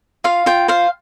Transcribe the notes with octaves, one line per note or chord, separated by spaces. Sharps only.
F4 F5
F4 G5
C5 F5